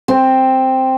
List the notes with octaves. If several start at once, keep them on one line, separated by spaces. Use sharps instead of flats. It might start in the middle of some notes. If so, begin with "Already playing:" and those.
C4